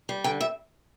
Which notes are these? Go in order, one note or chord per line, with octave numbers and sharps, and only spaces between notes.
G3
D3 G5
E5